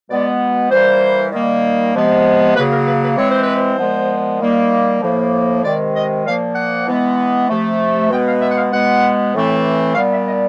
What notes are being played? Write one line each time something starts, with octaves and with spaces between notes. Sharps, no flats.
B2 G#3 B3 D5
E3 G3 A#3 C5
D#3 G3 A#3
C3 F3 G#3 B3
C#3 F#3 A#3 B4
A#4
B4
B4
E3 G#3 C4 C#5
C5
B4
C5
A#2 F3 G#3 B3
D#3 G3 A#3
A2 F3 A#3
C3 D#3 G#3 D5
D#5
A#2 F3 A#3 F5
F#5
E3 G#3 B3
C3 F3 A3
B2 G#3 B3 G5
F5
E5
F#5
F5
B2 G#3 B3 F#5
A2 E3 A3 C4
A#2 G3 B3 F5
E5
D#5